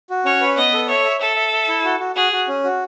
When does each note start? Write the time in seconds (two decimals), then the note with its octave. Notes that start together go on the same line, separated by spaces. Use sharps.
0.10 F#4
0.25 C#4 C#5
0.41 B4
0.57 B3 D#5
0.73 A4
0.89 C#5 E5
1.04 E5
1.20 A4 E5
1.36 E5
1.52 E5
1.68 E4
1.85 F#4
2.00 F#4
2.16 F#4 G#4
2.33 F#4
2.48 C#4
2.64 F#4